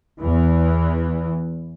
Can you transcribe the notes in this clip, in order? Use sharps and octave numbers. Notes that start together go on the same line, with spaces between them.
E2 E3